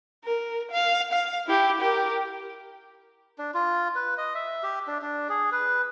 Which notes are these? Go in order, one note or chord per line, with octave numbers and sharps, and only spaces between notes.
A#4
F5
F5
E4 G4
G4 A#4
D4
F4
B4
D#5
E5
G4
D4
D4
G#4
B4